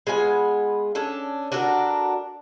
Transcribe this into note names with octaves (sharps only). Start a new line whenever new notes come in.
G#3 B3 F4 G#5
C#4 D4 A4
D4 F#4 A4 A#4